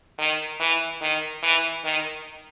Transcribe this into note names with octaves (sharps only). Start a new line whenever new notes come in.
D#3
E3
D#3
E3
D#3